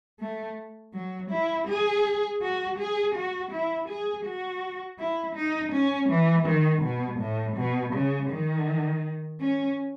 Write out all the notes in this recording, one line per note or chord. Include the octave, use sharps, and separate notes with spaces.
A3
F#3
E4
G#4
F#4
G#4
F#4
E4
G#4
F#4
E4
D#4
C#4
E3
D#3
B2
A2
B2
C#3
D#3
C#4